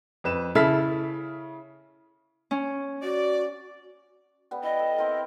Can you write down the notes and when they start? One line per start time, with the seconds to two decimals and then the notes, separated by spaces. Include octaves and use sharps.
0.24 F2 B4 E7
0.55 C#3 E4 A4 F6 B6
2.51 C#4
3.03 F#4 D5
4.51 G3 B3
4.63 E4 D#5
4.79 A4
4.98 C4 E4 A#4